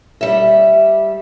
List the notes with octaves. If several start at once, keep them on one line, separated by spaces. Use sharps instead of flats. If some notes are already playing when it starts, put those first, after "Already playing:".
G3 E5